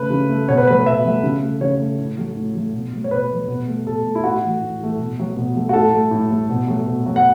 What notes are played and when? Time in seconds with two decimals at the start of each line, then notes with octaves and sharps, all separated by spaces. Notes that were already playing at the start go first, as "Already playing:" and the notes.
Already playing: C#3 A3 B4
0.10 C#3
0.29 A3
0.48 B2 C#5
0.57 B4
0.67 F#3 A3 B4
0.86 B2 E5
1.05 F#3 A3
1.23 C#3
1.43 A3
1.61 C#3 C#5
1.80 A3
1.98 A2
2.18 F#3 A3
2.36 A2
2.55 F#3 A3
2.74 B2
2.93 F#3 A3
3.04 C#5
3.11 B2 B4
3.30 F#3 A3
3.48 B2
3.68 A3
3.87 B2 A4
4.05 A3
4.15 E4
4.24 A2 F#4
4.43 E3 A3
4.61 A2
4.80 E3 A3
4.99 B2
5.18 F#3 A3
5.37 B2
5.55 F#3 A3
5.69 F#4
5.73 A2 A4
5.93 A3
6.11 A2
6.30 A3
6.49 B2
6.68 F#3 A3
6.86 B2
7.05 F#3 A3
7.16 F#5